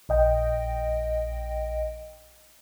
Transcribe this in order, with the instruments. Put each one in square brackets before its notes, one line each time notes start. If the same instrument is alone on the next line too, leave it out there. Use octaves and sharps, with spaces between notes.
[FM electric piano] A#1 D#5 G5